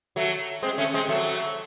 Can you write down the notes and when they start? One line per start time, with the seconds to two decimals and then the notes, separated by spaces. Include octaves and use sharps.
0.16 F#3 A3
0.63 G#3 C4
0.78 A3 C#4
0.94 G#3 C4
1.09 F#3 A3